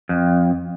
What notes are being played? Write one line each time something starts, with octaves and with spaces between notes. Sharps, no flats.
F2